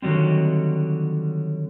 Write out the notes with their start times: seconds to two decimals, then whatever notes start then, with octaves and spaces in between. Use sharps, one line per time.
0.02 D3 D#3 F#3 G3 C4